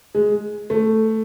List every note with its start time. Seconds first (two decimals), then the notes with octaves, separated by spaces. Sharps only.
0.15 G#3
0.70 A3